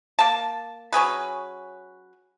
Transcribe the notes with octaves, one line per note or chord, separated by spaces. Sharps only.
A#3 A5
F#3 C#4 G#4 B4